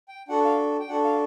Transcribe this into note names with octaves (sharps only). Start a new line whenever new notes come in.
G5
D4 F#4 A4 F#5
F5
G5
D4 F#4 A4 F#5
F5